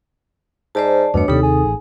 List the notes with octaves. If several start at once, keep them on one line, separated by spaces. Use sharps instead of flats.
G#2 C5 D5 A5
E2 G2 B2 A3 D4 C#5
D#2 C3 G3 D#4 A4
G#4
A1